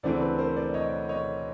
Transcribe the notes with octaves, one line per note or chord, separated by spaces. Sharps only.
D2 C#3 E3 A3 C4 C5 D5
B4
A#4 C5
C5 D5
C#5 D#5
C#5 D#5